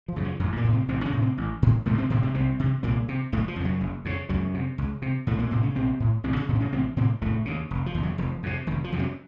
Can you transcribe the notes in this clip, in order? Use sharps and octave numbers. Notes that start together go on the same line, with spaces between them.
F3
F#2 C#3
F3
A1 F#2 F#3
A#2 A#3
A2
C3 C4
A1 C3 C4
C#3 C#4
A2
C3 C4
A1
A2
A1 A2 A3
C3 C4
A2 C3 C4
C3 C4
C2 C3 C4
C3
C2 A#2 A#3
C3
F#1 A2 A3
F3
F2
F#2 C#3 F#3
F#1
F2 C#3
C#2 F#2 F#3
C3
C#2
C3
A#1 A2 A3
A#2 A#3
A2 C3 C4
C#3 C#4
A#1 C3 C4
A2
A1 C3 C4
C#3 C#4
A2 C#3 C#4
C4
C#3 C#4
A1 C3 C4
A2 C3 C4
F1 A2 A3
D#2 C#3
F1
F3
D#2 C#3
F#2 F#3
F1 F3
F2 C3
F1 D#3
F3
F2 C3
F#2 F#3